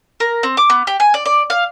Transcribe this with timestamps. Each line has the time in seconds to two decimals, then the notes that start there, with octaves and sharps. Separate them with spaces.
0.20 A#4
0.43 C4
0.57 D6
0.70 B3
0.87 G4
1.00 G#5
1.14 D5
1.26 D5
1.50 F5